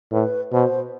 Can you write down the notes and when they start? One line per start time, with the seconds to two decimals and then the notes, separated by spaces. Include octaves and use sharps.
0.12 A2 B4
0.52 B2 C5